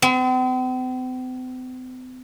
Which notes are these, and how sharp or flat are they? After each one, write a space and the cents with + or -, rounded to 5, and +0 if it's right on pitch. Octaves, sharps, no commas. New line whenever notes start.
C4 -45